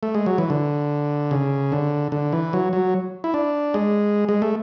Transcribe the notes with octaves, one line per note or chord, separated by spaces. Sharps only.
A3
G#3
F#3
E3
D3
C#3
D3
D3
E3
F#3
F#3
E4
D4
G#3
G#3
A3